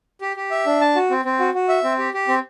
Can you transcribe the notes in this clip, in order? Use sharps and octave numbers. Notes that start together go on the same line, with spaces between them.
G4
G4
E5
D4
A5
F#4
C4
C4
F#4
F#4
E5
C4
G4
G4
C4